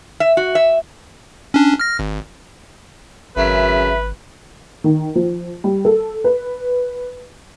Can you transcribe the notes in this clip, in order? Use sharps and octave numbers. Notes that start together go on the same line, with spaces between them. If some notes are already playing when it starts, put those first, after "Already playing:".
E5
F#4
E5
C#4 D4
F6 A#6
G#1
G#1 F#2 C#3 B4 E5
D#3
F3
G3
A4
B4